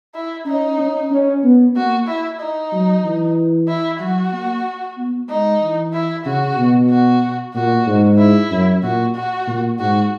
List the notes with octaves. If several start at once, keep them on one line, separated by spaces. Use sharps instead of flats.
E4
C#4 D#4
C#4
C#4
B3
A#3 F#4
E4
D#4
F#3
E3
E4
F#3 F#4
A#3
B3
G#3 D#4
E3
E4
C#3 F#4
B2
F#4
A#2 F#4
G#2
E4
F#2
A#2 F#4
F#4
A#2
G#2 F#4